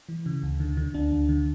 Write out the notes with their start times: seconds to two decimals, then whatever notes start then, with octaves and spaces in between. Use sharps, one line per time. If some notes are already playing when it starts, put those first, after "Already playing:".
0.09 E3
0.26 C#3
0.43 D2
0.60 D3
0.77 D3
0.94 D2 D4
1.12 D2
1.29 D3